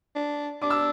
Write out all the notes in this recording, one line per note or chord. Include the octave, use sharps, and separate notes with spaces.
D4
D4 D6
E6